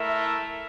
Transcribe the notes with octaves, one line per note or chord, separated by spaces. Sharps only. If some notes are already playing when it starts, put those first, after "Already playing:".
Already playing: A3 E4 A#4 E5